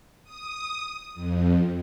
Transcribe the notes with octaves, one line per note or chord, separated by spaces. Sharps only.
D#6
F2